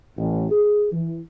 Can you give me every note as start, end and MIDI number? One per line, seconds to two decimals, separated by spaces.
0.18 0.46 33
0.51 0.89 68
0.92 1.17 52